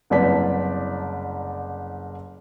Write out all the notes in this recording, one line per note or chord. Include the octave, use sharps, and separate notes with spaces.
F#1 C2 B4 D5 A5 B6